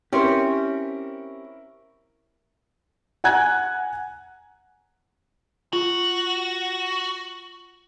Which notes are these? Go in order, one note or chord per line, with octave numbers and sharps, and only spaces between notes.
C4 C#4 E4 G4 A#4
F#5 G#5 A#5 F#6 G#6
F4 F#4